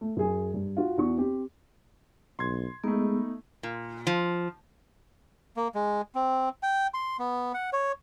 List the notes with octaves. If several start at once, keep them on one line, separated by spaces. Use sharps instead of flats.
A3
F#2 G#4
G2
F4 F#4
E2 F#4 C#6
C4 G4
B1 C6 G#6
G#3 A3 B3 D#4
A#2
F3
A#3
G#3
C4
G5
C6
B3
F#5
C#5